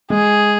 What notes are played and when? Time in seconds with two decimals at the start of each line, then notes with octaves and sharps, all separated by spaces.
0.10 G#3 G#4